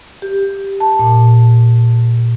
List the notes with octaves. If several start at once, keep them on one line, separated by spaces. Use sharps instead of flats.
G4
A5
A#2